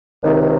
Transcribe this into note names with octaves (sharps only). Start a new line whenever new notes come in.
C#2 C3 D#3